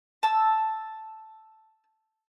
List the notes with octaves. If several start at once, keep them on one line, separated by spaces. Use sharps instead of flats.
A5 E6